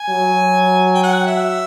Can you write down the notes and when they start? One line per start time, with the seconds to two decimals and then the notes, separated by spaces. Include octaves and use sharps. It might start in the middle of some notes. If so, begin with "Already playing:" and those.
Already playing: G#5
0.09 F#3
0.95 G5
1.03 F#5
1.27 E5